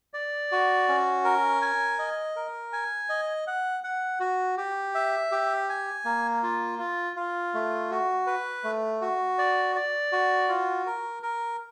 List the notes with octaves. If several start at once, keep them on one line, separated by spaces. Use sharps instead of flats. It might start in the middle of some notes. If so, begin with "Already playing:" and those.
D5
F#4
C#4
A#4
G#5
D#5
A#4
G#5
D#5
F#5
F#5
F#4
G4
E5
G4
G#5
A#3
F4
F4
F4
A3
F#4
B4
A3
F#4
D5
D5
F#4
F4
A#4
A#4